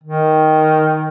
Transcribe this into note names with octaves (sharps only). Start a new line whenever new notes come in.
D#3